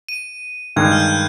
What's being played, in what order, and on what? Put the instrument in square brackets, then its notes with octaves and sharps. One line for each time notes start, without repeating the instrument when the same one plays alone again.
[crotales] D#7
[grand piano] G2 D#3 G#3 [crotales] G#6
[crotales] G6
F6
G6